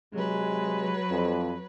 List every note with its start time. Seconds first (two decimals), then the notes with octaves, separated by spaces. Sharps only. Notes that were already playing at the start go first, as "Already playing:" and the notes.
0.14 C3 F#3 G#3 B4
1.10 F2